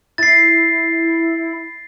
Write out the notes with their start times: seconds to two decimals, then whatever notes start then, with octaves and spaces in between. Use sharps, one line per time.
0.18 E4 A6 C7